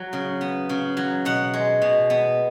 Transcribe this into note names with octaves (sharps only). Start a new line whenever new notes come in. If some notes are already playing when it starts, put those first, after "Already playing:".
Already playing: F#3
C#3
B3
C#3
F#3
B2 F#5
G#3
B2
B3